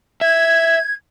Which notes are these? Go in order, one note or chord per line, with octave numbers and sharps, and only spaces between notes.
E5 G#6